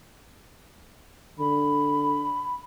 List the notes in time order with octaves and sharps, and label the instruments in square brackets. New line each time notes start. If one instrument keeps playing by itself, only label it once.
[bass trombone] D3 [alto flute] B5